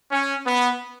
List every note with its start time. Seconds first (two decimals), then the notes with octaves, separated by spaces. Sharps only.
0.11 C#4
0.46 B3